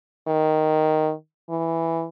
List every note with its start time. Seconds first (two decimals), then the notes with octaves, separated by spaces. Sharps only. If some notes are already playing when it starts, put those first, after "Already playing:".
0.27 D#3
1.49 E3